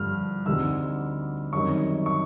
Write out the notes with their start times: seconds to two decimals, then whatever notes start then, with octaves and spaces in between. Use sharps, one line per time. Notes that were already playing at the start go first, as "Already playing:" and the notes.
Already playing: G2 D3 F3 F6
0.46 D2 D3 G3 C4 D#4 E6
1.52 F#2 D#3 G3 C4 D#4 C#6
2.06 C#6